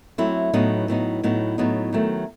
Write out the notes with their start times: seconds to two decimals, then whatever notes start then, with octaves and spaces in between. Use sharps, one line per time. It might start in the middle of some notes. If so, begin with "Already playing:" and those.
0.18 F#3 A3 C4 E4
0.54 A2 F#3 B3 D#4
0.88 A2 F#3 B3 D#4
1.23 A2 F#3 B3 D#4
1.58 A2 F#3 B3 D#4
1.93 D#3 F#3 A3